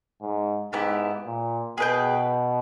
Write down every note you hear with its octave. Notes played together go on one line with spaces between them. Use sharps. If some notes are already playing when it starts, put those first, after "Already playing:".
G#2
G#2 B3 E4 G4
A#2
B2 G#4 B4 G5